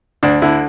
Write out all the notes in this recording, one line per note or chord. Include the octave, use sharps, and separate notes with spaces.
D2 D4
D3 E4